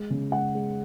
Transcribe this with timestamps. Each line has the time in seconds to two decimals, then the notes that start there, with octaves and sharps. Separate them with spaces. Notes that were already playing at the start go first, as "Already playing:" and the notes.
Already playing: G#3
0.10 C#3
0.32 G#3 F#5
0.55 G#3